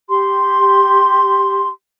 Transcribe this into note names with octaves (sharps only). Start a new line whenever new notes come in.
G4 C6